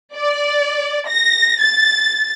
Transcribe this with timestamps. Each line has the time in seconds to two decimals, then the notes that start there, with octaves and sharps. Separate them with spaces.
0.16 D5
1.07 A#6
1.60 A6